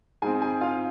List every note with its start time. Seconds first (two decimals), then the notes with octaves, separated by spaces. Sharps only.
0.22 G#2 G#3 C4 G#4 G#5
0.42 G#4 G#5
0.61 F4 F5